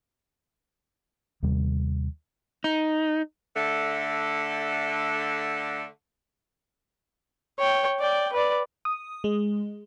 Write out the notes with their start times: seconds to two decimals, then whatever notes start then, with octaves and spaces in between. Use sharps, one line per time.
1.43 D#2 C3 G3
2.64 D#4
3.55 D3 A3
7.59 C#5 G5
8.00 D5 G5
8.32 B4 D5
8.85 D#6
9.24 G#3